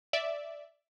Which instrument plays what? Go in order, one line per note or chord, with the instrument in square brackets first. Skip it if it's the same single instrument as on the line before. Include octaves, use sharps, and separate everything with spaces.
[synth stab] D5 E5